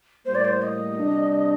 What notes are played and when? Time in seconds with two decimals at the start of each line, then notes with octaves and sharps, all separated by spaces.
0.24 A2 G3 A#3 C5
0.34 D5
0.44 C5
0.62 D#5
0.98 C3 G3 D4